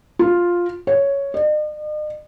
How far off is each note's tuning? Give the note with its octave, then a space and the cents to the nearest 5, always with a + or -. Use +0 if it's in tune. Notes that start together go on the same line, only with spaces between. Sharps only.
F4 +5
C#5 +5
D#5 -45